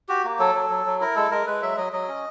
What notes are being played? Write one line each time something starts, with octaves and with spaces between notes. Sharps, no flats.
F#4 G4
A#3
F#3 A4
F#3
F#3
F#3
E4 A#4
G#3 A4
G#3 A#4
G#3 B4
F#3 E5
F#3 D#5
F#3 D#5
C#4